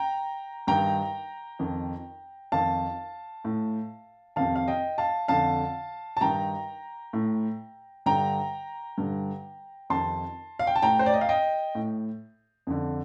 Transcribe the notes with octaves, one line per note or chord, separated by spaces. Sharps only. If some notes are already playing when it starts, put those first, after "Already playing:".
Already playing: G5 A#5
G2 D#3 G5 A#5
F2 D#3
F2 D#3 F5 A5
A2
F2 C3 D#3 F5 A5
F5
D#5 G5
F5 A5
F2 D3 F5 A5
A5
G2 D#3 G5 A#5
A2
G2 D3 G5 A#5
G2 D3
F2 C3 D#3 A5 C6
F5
G5
A5
A2 G5 A#5
C5
D5
D#5
F5
D#5 G5
A2
F2 D3